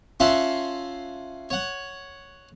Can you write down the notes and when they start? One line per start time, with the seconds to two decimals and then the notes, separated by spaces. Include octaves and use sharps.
0.20 C#4 F4 E5 F#5 A5 C6
1.50 C#5 F#5